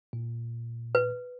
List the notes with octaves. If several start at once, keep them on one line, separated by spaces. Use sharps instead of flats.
A#2
B4